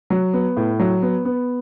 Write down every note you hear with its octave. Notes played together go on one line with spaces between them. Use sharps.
F#3
B3
A2
F#3
B3
B3